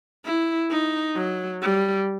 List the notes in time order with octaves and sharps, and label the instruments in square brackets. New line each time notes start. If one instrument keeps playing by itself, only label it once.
[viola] E4
D#4
F#3
G3